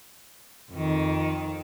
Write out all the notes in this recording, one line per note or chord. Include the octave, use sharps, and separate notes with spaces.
F2 D#3